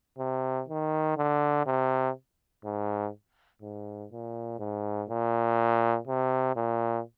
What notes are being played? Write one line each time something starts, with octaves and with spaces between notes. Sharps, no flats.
C3
D#3
D3
C3
G#2
G#2
A#2
G#2
A#2
C3
A#2